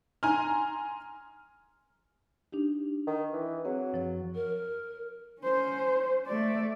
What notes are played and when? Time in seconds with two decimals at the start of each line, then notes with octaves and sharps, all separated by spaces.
0.23 G#5 A#5 C6 F6
2.52 D4 D#4 G4
3.07 D#3
3.33 E3
3.65 F#3 C4 G#4
3.92 F#2 F3 C#5
4.35 A#4
5.41 C#4 C5
6.27 A3 D5